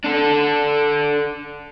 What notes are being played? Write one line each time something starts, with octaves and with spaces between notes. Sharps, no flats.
D4 A4